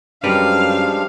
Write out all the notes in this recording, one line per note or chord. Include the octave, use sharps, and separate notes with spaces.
F#2 F3 G3 G#3 D4 A#4 B4 F5